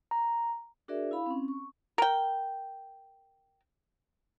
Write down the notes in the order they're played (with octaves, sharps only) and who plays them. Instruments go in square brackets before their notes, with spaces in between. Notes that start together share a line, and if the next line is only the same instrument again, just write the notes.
[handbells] A#5
[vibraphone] D4 F#4 G#4 A#4 D5 E5
E4 F5 B5
C4 C#4
C#6
[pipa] A#4 G5